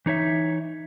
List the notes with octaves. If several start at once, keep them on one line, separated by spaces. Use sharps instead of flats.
E3 D#4 C#5 E5